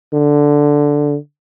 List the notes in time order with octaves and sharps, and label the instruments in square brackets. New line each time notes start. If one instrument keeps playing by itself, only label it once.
[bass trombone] D3